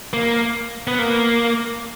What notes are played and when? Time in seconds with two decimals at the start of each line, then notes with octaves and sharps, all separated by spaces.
0.13 A#3
0.87 B3
0.99 A#3